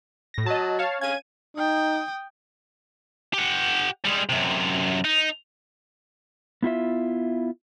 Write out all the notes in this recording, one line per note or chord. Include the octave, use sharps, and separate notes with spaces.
A2 A#6
F#3 D#5 A5
C#5 F5 A5
C#4 F5 G#6 D#7
D#4 G5 D#6
G4 F#5
G3 G#3
F#2 C3
D#4
B3 E4 F4 E5